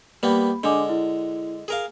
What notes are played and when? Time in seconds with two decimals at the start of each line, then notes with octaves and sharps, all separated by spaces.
0.23 G3 A#3 B3 B5
0.64 D3 G#3 D4 G#5 D6
0.89 E4
1.68 G#4 A#4 F5